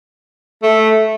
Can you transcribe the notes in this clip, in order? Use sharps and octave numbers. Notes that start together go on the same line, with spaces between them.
A3